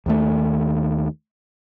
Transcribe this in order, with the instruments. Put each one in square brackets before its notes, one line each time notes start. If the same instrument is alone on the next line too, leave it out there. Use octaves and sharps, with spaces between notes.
[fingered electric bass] D#2 D#3 A3